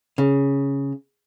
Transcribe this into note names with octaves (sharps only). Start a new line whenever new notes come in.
C#3